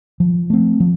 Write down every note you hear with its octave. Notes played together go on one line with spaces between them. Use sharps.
F3
A3 C4
F3